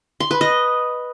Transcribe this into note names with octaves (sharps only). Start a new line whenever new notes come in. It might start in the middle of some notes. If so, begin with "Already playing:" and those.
C6
B4
D#5